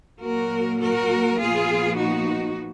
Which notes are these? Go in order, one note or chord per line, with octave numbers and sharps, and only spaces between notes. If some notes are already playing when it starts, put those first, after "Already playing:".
A#2 F#3 A#3 F#4 A#4
F#4 A#4
A#2 F3 B3 F4 G#4
D#4 F#4